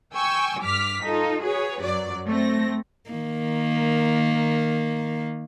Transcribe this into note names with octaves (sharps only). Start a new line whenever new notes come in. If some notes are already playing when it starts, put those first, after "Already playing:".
G5 G#5 C#6 E6
G2 D6 F6 B6
D#4 F4 A4
F#4 G#4 B4 C#5
F#2 F#3 D5
A3 C4 A#6
D#3 A#3